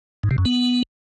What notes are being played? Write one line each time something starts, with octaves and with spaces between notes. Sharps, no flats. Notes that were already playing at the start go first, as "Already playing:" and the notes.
G#2
C3
F#2
B3